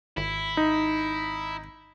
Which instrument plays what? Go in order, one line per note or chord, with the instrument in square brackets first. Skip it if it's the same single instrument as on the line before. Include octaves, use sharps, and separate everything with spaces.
[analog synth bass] G#1 [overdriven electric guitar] E4
[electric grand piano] D#4